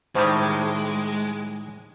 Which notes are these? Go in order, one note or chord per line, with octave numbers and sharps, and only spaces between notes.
A2 D#3 G3 G#3 C5 A5 C#6